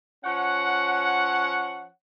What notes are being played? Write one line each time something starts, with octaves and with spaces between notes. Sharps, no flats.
F3 C#4 C#5 F#5